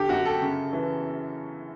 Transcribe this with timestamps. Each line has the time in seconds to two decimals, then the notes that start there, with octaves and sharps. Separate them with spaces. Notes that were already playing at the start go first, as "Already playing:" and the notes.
Already playing: D3 G4 A4
0.09 F#2 F#4
0.26 A4
0.42 C#3
0.73 E3